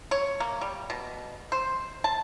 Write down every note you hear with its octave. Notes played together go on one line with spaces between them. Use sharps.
C#5
A#3
G3
B2
C5
A5